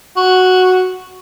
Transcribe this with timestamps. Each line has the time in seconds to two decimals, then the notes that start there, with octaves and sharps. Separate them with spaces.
0.16 F#4